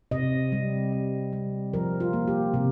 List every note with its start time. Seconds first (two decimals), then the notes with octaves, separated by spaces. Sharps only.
0.11 C3 D#5
0.52 G3
0.92 G3
1.33 G3
1.74 F3 A#4
2.00 F4
2.13 A#3
2.28 G4
2.54 C3